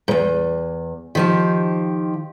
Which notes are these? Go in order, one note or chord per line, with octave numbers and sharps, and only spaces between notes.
E2 G#2
D#3 F3 G4